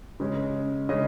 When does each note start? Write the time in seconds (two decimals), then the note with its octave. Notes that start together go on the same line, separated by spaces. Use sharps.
0.20 C#3 G#3 C#4
0.89 C#3 G#3 C#4 D#5